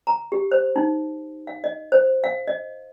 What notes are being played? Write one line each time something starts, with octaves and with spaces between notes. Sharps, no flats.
A#5
G4
C5
D#4
F5
D#5
C5
F5
D#5